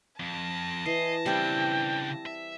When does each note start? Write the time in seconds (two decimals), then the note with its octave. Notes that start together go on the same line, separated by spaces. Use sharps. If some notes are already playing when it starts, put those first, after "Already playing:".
0.20 F2 A5 A#6
0.86 E3 D#5 C7
1.26 C#3 G3 C4 D4 E4 G5
2.26 E5